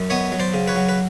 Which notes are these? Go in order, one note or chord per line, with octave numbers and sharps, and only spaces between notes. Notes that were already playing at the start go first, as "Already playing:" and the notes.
Already playing: F#2
B3 C#5 D#5
F#3
C5 D5
C#3
B4 C#5
F#3
B4